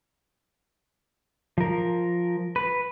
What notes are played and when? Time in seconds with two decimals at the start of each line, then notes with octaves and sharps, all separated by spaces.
1.58 F3 A#4
2.56 B4